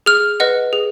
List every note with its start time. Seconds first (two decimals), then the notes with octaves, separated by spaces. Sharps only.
0.06 G#4 F6
0.40 B4 D#5 F#5
0.73 G#4